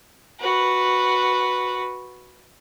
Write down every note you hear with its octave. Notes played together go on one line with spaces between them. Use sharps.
F#4 B4